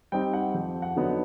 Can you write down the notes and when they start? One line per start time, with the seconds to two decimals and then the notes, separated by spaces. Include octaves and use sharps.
0.12 G3 C4 D#4 G5
0.33 F#5
0.54 F2
0.82 F#5
0.96 D3 F#3 B3 D#4